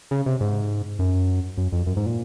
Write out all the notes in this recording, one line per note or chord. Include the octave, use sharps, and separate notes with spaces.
C#3
C3
G#2
F#2
F#2
F2
F#2
G#2
A#2